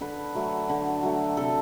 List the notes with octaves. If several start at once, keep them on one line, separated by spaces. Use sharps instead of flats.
D3 B4
F#3 A3
D3
F#3 A3
C3 A4